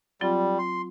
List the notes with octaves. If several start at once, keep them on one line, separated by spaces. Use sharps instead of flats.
F#3 G3 C4 F4
C6